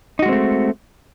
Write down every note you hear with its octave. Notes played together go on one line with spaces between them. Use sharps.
G#3 A3 C4 D#4 F#4